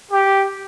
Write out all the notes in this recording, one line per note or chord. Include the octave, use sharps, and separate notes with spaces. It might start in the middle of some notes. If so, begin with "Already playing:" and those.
G4